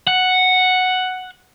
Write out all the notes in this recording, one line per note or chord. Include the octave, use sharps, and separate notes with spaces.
F#5